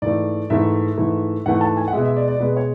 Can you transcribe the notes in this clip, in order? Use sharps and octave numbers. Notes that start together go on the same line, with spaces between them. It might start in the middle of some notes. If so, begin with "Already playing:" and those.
G#2 E3 A3 D5
G#2 E3 A3 E5
G#2 E3 A3
G#2 E3 A3 F#5
A5
G#5
F#5
B2 G#3 E5
E5
D5
D5
B2 G#3 B4
C#5